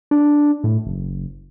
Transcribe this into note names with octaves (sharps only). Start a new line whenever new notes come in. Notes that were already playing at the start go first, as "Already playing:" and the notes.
D4
A2
F#1